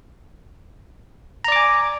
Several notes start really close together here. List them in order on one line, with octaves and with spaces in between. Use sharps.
A#5 D5 D6 G#5